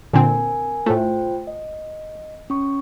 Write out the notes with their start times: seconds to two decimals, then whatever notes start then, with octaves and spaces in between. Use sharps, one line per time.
0.13 A#2 D3 C4 A#4 G#5
0.86 A2 A3 F4 C5 G5
1.47 D#5
2.50 C#4 C#6